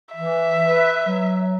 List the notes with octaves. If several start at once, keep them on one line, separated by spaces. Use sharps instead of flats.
E3 E5
B4
F#3